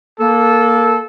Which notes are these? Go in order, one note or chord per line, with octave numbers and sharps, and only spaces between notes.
A#3 A4